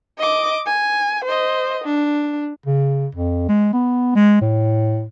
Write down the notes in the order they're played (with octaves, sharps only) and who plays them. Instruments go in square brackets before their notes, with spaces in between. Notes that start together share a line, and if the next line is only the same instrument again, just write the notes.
[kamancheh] D#5 D6
G#5
C5 D#5
D4
[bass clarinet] C#3
F2
G#3
B3
G#3
A2